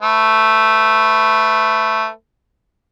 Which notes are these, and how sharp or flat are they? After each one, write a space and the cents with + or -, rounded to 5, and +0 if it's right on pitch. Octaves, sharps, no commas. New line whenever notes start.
A3 +0 B4 +20